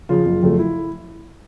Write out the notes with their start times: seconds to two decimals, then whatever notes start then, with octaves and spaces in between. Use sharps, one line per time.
0.09 C#3 F3 F4
0.25 F#1
0.42 F2 C#3 F#3 A3
0.59 E4